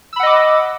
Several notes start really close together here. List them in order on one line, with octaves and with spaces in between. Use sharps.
E6 B5 F#5 D#5 D6